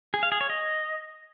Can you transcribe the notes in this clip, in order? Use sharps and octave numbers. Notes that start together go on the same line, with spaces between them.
G#4
F5
G#4
C#5
D#5